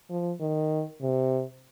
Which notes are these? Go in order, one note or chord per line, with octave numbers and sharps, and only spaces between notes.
F3
D#3
C3